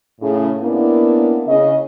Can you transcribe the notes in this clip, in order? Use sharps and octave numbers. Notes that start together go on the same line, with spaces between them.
A2 C#3
A#3 B3 C#4 D4 E4
C#3 D#5